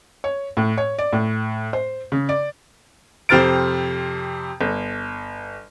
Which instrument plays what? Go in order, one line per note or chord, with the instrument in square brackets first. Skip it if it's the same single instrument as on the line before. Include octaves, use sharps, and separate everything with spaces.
[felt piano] C#5
A2
C#5
D5
A2
C5
C#3
D5
[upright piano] F2 C3 C5 F6 A6 D7
G1